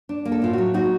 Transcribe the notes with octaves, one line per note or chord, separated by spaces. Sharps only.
D4
A#3
A4
A2 F4
F#3 F#4
D#4 F#4